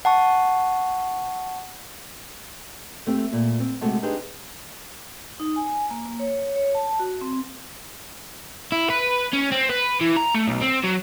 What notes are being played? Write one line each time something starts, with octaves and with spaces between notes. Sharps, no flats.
F#5 A5 C#6
A3 C4 G4
A#2
C4
C3 G#3 A3 F#4 C#5 A5
D4 D#4 G4 G#4 B4 C5
D#4
G#5
A#3
A#3
C#5
C#5
A5
F#4
C4
E4
B4
C#4
C4
B4
E3
A#5
A3
B1
C4
F#3